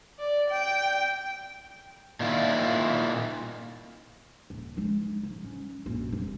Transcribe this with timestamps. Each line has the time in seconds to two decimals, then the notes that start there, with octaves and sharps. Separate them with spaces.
0.18 D5
0.49 G5
2.20 A#2 D#3 E4 F4
4.50 D#1
4.77 G#3 D#4
5.23 G#2
5.44 C#4
5.86 A#1 F#2
6.12 F1 B1